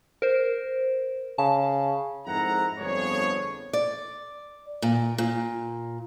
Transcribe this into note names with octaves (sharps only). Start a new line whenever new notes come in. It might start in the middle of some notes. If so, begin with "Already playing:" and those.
A#4 C5
C#3 A5
F2 G#2 E4 A#4 F#5 A#5
G1 F2 B3 D4 G#4 C#5
D5
A#2
A#2